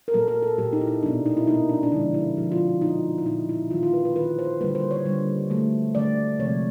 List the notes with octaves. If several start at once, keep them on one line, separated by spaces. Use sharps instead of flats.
A#4
A#2 F#3 A#3 A4
A#4
A4
A#2 F#3 A#3 G4
D#4
E4
D#4
B2 F#3 A#3 D4
D#4
E4
B2 F#3 A#3 D#4
D4
D4
D3 F3 G#3 D#4
E4
D3 F3 G#3 F#4
F4
C#4
A#2 F#3 A#3 D#4
E4
A#2 F#3 A#3 D#4
E4
D#3 F#3 A#3 F4
F4
B4
B4
D#3 F#3 A#3 B4
C5
D3 G3 A#3 B4
C5
C#5
D3 G3 A#3
D3 F#3 A3
D3 F#3 A3 D5
C3 F3 G#3 C#5